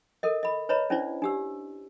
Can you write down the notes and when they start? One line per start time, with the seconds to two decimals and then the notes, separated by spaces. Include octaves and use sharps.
0.23 A4 A#4 D#5
0.43 D#5 B5
0.69 B4 C#5 D#5 A#5 B5
0.90 C#4 D4 E4 C5 D5
1.22 D4 G4 E6